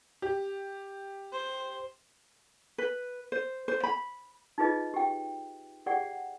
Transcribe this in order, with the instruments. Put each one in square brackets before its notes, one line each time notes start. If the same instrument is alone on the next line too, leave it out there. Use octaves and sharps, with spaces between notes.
[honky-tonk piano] G4
[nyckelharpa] C5
[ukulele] B4
C5
C5
B5
[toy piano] D#4 F4 G#4 B4 D#5
G4 G5
G4 G#4 D5 F#5 G5